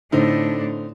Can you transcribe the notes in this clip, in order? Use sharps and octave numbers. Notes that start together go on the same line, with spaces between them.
A2 D3 C4 D4 D#4